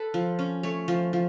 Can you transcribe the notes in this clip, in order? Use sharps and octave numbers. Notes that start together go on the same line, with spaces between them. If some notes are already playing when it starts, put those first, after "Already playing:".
Already playing: A4 B4
F3
C#4
A3 C#5
F3
F3